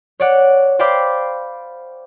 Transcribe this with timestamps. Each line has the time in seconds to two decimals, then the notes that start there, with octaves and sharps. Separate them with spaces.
0.20 C#5 D5 F#5
0.79 C5 D5 F5 G5 B5 D6